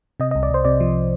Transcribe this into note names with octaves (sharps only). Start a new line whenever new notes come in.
C3 D#5
C2 D#5
D5
C2 C5
C3 D5
F3